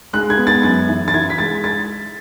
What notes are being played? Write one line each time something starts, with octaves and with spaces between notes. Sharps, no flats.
G#3 F#6
G#6
B3
A6
F#2 A6
E3
A6
E3 G#6
B6
G#3 A6
A6